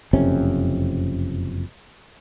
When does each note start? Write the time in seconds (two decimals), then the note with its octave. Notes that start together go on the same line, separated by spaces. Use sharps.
0.13 F#1 F2 C3 C#4